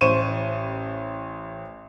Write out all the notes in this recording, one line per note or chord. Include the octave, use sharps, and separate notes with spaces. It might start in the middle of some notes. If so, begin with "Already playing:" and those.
A1 C5 C#6 D#7 E7